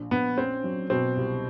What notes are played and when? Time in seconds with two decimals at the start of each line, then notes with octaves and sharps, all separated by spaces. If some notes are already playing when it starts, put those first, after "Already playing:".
Already playing: A#1
0.11 A#1 B3
0.37 C4 C#4
0.64 F#3
0.90 B2 C4
1.17 C2